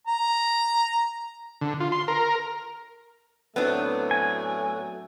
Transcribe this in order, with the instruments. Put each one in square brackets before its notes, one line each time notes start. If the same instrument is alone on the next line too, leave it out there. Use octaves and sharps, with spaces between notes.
[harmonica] A#5
[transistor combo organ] D3
F4
C6
A#4
[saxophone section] A2 F#3 A3 [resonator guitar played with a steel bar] B3 C4 D4
[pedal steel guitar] G#5